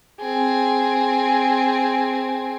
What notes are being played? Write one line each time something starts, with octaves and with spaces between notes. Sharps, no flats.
C4 G#4